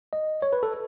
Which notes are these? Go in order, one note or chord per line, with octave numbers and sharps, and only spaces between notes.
D#5
C#5
B4
A4